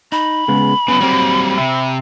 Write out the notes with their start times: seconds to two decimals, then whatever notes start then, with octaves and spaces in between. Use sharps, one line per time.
0.12 D#4 B5
0.48 C#3 G#3 B3
0.88 C#3 F#3 B3
1.00 F#3 G3 A#3 C4
1.58 C3 E5